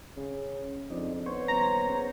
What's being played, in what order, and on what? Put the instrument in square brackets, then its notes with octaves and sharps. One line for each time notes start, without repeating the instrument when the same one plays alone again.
[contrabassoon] C#3
[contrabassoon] F2 [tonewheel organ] D4 D#4
[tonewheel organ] B3 C5 C#5
[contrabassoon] D#1 [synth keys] A#5
[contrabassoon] C#3